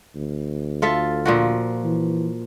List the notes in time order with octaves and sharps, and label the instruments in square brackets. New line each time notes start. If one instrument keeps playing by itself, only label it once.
[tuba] D2
[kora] F4 A4 E5
A#2 F3 F#4
[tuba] E3